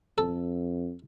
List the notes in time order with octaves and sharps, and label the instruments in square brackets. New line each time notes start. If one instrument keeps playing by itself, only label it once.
[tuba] F2 [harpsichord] A4